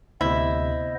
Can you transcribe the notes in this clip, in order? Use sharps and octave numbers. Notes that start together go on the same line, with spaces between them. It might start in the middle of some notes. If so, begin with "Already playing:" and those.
D2 C3 B3 E4 C5 D#5